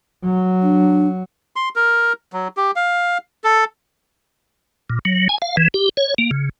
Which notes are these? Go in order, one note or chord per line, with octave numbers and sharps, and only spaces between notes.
F#3
D4
C6
A#4
F#3
G4
F5
A4
A#2
F#3
G#5
F5
E3
G4
C#5
A#3
C#3